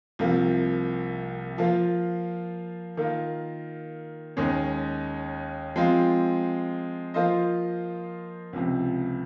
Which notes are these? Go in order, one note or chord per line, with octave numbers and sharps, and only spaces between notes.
C2 C3 F3 A#3
F3 A#3 F4
D#3 A#3 F4
D#2 D#3 G#3 C#4
F3 G#3 C4 F4
F3 A#3 F4 C5 D#5
C#2 C3 F3